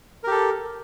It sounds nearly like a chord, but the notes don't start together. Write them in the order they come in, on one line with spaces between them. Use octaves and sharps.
A#4 G4 A4